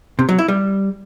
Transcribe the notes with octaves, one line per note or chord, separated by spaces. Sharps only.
C3
F#3
E4
G3